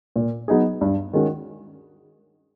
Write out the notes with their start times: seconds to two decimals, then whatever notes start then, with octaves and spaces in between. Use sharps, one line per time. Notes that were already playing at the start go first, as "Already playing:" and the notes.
0.16 A#2
0.48 F#3 B3 D#4 G#4
0.81 G2
1.13 D#3 G#3 C#4 F#4